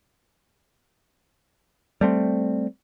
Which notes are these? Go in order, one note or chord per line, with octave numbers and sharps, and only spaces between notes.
G3 A3 C4